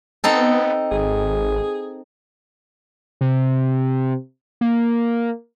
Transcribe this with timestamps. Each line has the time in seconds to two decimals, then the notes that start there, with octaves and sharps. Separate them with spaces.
0.24 B3 C4 D#4 A4
0.91 G#1 G#4
3.21 C3
4.61 A#3